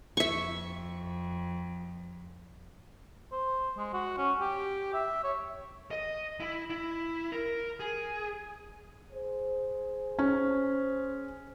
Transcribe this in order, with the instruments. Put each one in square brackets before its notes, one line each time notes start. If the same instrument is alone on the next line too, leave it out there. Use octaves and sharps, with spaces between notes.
[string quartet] F2 [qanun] E5 C#6
[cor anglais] C5
G#3
F#4
C#4
G4
E5
C#5
[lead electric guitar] D#5
E4
E4
A#4
G#4
[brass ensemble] G#4 C5
[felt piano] C#4